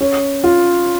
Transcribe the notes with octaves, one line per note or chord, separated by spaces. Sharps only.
C#4
F4